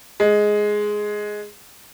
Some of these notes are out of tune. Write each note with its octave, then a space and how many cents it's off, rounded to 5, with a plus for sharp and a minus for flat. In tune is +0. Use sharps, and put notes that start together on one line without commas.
G#3 +5